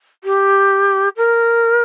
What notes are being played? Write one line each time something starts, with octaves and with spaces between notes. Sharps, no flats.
G4
A#4